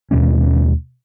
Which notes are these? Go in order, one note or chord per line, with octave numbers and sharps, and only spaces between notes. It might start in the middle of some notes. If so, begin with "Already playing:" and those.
D#2 B2 G#3 C#4